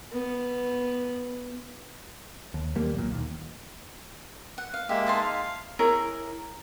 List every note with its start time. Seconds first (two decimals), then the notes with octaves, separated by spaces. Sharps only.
0.13 B3
2.54 D#2
2.76 D#2 G3 A#3
2.94 B1 A#2
3.11 D#2
4.58 F#5
4.74 F5
4.89 G#3 A#3 G4 E5
5.07 D#4 A5 C6
5.22 F5
5.79 E4 G#4 A#4 C#5